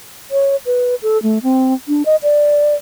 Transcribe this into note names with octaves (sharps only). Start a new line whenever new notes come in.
C#5
B4
A4
A3
C4
D4
D#5
D5